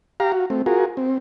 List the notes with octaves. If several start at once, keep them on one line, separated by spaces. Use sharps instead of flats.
G4 F5 A#5
F#4
A3 C4
F4 F#4 G#4 A#4
C4